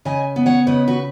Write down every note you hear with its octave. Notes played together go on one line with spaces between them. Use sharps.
C#3 D#5 G#5
B3
C#5 F#5
C#3 B4 D#5
F#4 B4